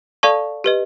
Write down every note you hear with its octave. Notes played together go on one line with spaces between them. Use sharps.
A4 D5 F5 A5 C#6
G4 B4 D#5